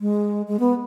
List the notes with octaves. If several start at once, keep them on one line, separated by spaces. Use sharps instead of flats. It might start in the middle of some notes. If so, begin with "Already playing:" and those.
G#3
G#3
B3